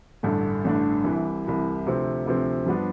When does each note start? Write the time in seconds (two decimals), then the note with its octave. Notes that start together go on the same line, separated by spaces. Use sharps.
0.23 A1 G2 D3 A3 D4
0.64 A1 G2 D3 A3 D4
1.04 C2 C3 E3
1.45 C2 C3 E3
1.86 D2 C3 F3 C4
2.26 D2 C3 F3 C4
2.66 G2 F3 B3 D4